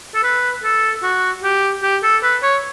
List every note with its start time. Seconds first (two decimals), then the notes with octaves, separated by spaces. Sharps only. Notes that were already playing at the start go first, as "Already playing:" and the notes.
0.15 A4
0.23 B4
0.63 A4
1.03 F#4
1.43 G4
1.83 G4
2.03 A4
2.23 B4
2.42 C#5